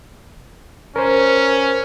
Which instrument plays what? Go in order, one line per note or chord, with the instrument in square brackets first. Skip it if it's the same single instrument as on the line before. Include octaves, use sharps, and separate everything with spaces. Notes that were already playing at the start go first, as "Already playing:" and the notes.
[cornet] C#4 [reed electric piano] A#4 C5